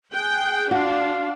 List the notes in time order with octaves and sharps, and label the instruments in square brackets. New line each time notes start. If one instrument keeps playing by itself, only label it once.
[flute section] G#4 F#6 G6 [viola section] G5
[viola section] D4 [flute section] F4 F5 [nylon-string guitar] F#4